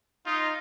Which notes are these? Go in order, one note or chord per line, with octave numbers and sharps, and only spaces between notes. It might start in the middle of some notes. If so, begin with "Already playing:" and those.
D#4 F4